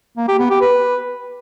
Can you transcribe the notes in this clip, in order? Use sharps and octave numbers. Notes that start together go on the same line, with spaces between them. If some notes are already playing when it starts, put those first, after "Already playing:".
A#3
G4
B3
G4
B4